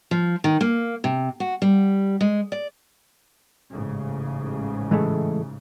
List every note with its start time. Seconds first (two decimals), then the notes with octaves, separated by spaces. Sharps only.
0.11 F3
0.44 D#3
0.61 A#3
1.04 C3
1.40 F#4
1.62 G3
2.21 G#3
2.52 D5
3.71 A1 G#2 C#3
4.91 E3 G#3 A3